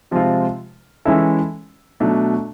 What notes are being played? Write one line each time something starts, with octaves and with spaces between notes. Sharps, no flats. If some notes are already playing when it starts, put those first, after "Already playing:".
C3 F3 G#3 C4 F4
E3 G#3 C#4 E4 A4
B2 F#3 A3 D4